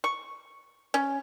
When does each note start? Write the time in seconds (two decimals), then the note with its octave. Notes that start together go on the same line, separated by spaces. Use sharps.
0.04 C#6
0.94 C#4